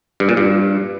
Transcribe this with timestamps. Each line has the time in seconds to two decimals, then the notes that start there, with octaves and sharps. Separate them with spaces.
0.20 G2
0.29 A#2
0.37 G2